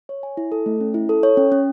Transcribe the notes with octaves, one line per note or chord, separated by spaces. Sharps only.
C#5
G#5
E4
A4
A3
C#4
E4
A4
C#5
C#4
C#4